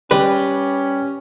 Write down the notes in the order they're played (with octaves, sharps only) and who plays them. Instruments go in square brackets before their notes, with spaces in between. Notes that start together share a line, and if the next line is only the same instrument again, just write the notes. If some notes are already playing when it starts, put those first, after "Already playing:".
[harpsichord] G3 [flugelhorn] C#4 [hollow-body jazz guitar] B4